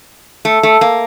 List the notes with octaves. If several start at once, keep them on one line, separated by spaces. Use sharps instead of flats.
A3
A3
A#3